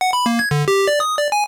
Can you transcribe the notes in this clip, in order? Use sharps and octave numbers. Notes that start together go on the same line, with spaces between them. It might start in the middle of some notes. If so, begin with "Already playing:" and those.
F#5
B5
A#3
G#6
D3
G4
D5
D#6
D5
G#5